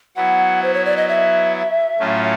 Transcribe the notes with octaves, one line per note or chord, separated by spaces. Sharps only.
F#3 B3 E4 F#5
C5
C#5
D5
D#5
E5
A2 F#3 A3 C#4 F4